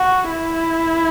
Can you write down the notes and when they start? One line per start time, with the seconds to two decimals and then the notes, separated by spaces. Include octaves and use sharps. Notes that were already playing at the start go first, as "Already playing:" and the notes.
Already playing: F#4
0.31 E4